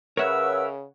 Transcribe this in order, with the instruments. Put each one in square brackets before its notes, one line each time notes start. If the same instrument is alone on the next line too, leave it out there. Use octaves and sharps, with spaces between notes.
[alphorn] C#3 [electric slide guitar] A#4 E5 [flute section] B4 E6 [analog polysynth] C#5 F#5